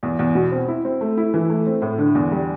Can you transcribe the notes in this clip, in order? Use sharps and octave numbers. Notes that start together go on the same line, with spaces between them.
E2
E2
B2
C4
E4
C4
A3
E4
E3
A3
C4
A2
D3
E2
G3